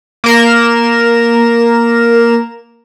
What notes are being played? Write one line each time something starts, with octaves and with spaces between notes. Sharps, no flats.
A#3 A#4 E7